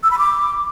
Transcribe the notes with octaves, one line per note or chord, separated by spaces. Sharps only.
E6
B5
D6